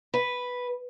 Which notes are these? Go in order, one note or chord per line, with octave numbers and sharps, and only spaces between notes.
B4